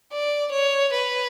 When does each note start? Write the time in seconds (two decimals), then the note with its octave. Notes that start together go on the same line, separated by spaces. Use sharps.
0.12 D5
0.52 C#5
0.92 B4